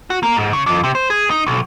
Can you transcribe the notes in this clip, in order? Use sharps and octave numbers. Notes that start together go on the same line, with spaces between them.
F#4
A#3
G#2
C#3
F2
C3
C5
G#4
D#4
B1